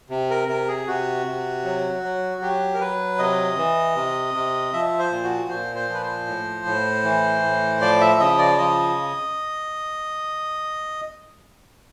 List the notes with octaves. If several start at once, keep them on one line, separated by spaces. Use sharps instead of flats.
C3
A#4
C3 A#4
G#4
C3 F#4
C3
F#3
F#3
F#3 G4
A#4
F#3 B4
C3 D#5
E3
C3
C3
F3 E5
C5
A#2
F#4
A#2 C5
C5
F3 B4
C5
A2
A2
E3
A2
F3 D5
E5
C#3 D#5
D5
F3 D#5